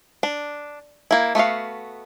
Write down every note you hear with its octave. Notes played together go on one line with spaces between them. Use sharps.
D4
A#3 E4
A3 B3 F#4 F5